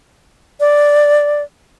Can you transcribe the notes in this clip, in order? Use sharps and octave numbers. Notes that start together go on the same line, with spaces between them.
D5